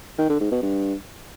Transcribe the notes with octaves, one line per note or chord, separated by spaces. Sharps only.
D#3
D3
G#2
B2
G2